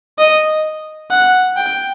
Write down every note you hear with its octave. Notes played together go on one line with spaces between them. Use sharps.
D#5
F#5
G5